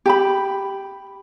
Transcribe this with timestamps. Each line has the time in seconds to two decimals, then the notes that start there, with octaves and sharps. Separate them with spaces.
0.06 G4 A5 B5